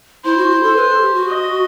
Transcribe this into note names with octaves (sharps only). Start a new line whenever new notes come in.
E4 C5
F#4
E4
A4
B4
A4
G4
F#4
D#5